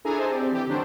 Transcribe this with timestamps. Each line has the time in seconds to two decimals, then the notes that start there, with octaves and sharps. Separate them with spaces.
0.04 D4 E4 G#4 A4 G#5 A#5
0.18 A4 C5 D#5 G#5 A5
0.29 C4 G4 D5
0.52 E3 G4
0.67 D3 F#3 G3 D4 C5